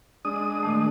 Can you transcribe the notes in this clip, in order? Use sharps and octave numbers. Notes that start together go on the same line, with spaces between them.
G#3 D4 D#6
A#2 D#3 A3